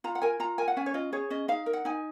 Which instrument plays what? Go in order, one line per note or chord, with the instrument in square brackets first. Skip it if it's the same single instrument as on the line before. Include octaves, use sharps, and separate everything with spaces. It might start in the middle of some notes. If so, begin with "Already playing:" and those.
[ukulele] F4 A#5
F#5
A#4 G#5
F4 A#5
A#4 G#5
F#5
C#4 G#5
C#5
F4 D#5
G#4 C#5
C#4 D#5
D#4 F5
A#4
F#5
D#4 G#5